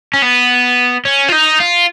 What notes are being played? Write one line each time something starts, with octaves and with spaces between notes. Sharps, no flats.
C#4
B3
C#4
F4
D#4
F4